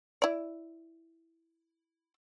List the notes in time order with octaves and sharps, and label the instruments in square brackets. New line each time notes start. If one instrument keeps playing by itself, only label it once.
[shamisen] E4 D5